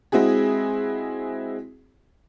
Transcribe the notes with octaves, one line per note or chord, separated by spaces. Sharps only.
G#3 C4 E4 F#4 G#4